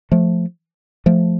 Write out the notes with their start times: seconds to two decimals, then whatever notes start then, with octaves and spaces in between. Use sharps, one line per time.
0.12 F3 A3
1.06 F3 A3